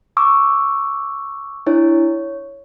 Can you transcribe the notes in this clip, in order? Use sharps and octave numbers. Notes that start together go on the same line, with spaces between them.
C#6 D6 E6
D4 E4 C#5
C#5